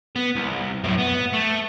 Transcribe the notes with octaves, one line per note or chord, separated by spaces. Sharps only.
B3
C2
F#2 A2
B3
A3